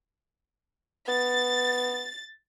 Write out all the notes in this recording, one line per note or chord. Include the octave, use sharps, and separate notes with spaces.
B3 A6